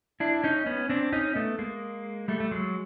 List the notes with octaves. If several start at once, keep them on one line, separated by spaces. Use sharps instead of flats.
D4 E4
C#4 D#4
B3 C#4
C4 D4
C#4 D#4
A3 B3
G#3 A#3
G3 A3
A3
F#3 G#3